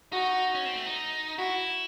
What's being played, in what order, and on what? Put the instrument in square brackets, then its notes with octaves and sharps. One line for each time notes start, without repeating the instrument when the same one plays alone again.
[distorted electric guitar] D#4 [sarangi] F#4
[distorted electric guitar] C#4
C4
A3
D#4
[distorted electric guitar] E4 [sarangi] F#4